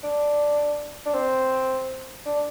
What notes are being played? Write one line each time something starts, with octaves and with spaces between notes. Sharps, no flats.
D4
D4
C4
D4